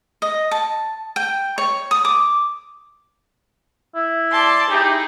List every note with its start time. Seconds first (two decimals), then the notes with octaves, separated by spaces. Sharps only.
0.22 D#5
0.51 A5
1.16 G5
1.58 C#5
1.91 D#6
2.05 D6
3.95 E4
4.32 D5 A5 C6
4.70 D#4 E4 G4 G#4